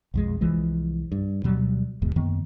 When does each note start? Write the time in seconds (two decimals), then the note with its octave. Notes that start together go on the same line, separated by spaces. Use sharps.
0.14 B1 F2 G#3
0.41 C2 E3 F3 G#3
1.12 G2
1.43 D2 B2 F#3 G3
2.02 D#1 D#2 G#2 B2
2.16 F#2 D#3 A#3 B3